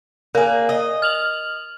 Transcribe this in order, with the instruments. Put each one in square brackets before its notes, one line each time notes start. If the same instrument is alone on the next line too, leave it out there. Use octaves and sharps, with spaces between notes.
[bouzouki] A#3 G#4 [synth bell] A#4
[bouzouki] D#5
[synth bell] F6 F7 F#7